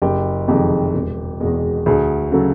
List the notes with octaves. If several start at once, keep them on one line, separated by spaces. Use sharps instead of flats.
F#1 G4
F2 C3 D#3 G#3 G4
E1
E2 B2 G#3
D2 G#4
C#3 F#3 A4